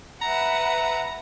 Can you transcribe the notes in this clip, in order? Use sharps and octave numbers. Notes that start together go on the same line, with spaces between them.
B4 E5 F#5 A#5